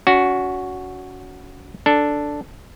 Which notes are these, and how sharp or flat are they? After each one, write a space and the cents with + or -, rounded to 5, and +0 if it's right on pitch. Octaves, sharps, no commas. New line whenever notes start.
C#4 +35 F#4 +0
D4 +0 A4 +0